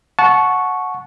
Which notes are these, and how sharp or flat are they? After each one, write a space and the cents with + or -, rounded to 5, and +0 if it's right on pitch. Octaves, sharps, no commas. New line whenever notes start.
F#5 -15 A5 -20 C#6 +0